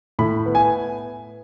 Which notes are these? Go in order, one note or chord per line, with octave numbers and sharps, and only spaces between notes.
A2 B5
B3
G#5